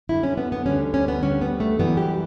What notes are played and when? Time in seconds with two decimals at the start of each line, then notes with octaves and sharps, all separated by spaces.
0.09 F#2 D3 G3 E4
0.23 C#4
0.37 B3
0.52 B3
0.66 D2 D3 G3 C#4
0.94 C#4
1.08 B3
1.22 D2 D3 G3 C#4
1.41 B3
1.60 A3
1.79 F#2 E3 G3 B3
1.97 G4